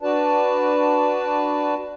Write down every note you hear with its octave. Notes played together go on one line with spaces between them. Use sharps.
D4 F#4 B4 D5 A5